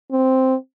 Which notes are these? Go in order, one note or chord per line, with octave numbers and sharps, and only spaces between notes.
C4